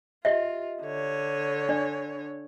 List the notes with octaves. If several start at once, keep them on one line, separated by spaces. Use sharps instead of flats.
F4 G4 D#5 E5
D3 C#5
D4 D5